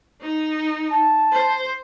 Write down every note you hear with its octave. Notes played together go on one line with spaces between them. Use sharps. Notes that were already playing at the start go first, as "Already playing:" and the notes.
D#4
A5
C5